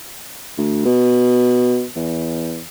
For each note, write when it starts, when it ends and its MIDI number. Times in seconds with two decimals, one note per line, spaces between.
0.58 0.83 38
0.85 1.85 47
1.96 2.61 40